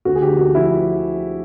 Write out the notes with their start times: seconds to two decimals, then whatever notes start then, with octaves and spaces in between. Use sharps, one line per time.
0.05 D2 F#4
0.15 G#4
0.22 D3 G4
0.38 D2 F#4
0.55 F3 E4